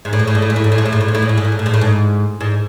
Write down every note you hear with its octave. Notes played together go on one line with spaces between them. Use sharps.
G#2
A2
G#2
A2
G#2
A2
G#2
A2
G#2
A2
G#2
A2
G#2
A2
G#2
A2
G#2
A2
G#2
A2
G#2
A2
G#2
A2
G#2
G#2